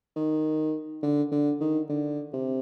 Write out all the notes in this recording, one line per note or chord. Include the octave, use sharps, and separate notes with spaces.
D#3
D3
D3
D#3
D3
C3